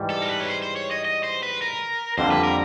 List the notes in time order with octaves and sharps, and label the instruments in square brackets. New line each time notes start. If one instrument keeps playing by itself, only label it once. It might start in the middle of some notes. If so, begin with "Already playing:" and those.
Already playing: [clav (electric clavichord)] G#2 E3 G3
[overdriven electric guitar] A4
A#4
B4
C#5
C5
C5
C#5
D#5
D#5
C5
B4
A#4
[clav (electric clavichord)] F2 D3 G3 A#3 [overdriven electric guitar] C5
[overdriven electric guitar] B4
A#4